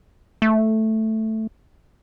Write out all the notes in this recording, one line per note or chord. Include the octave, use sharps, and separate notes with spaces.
A3